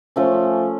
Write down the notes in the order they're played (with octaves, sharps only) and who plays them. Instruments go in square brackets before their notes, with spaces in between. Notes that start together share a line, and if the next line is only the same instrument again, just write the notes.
[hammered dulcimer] F3 A3 C#4